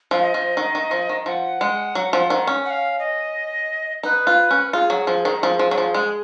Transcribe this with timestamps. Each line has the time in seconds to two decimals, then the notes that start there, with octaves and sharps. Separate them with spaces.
0.11 F3 F5
0.22 D#5
0.34 F3
0.57 D#3
0.75 D#3
0.91 F3
1.09 D#3
1.26 F3 F#5
1.61 G#3
1.95 F#3
2.13 F3
2.30 D#3
2.47 C#4
2.65 F#5
2.70 F5
2.99 D#5
4.03 D#4 B4
4.27 F4
4.51 C#4
4.73 F4 G#4
4.90 F#3
5.07 F3
5.25 D#3
5.43 F3 G#4
5.59 F3
5.71 F#3
5.78 F3
5.94 G#3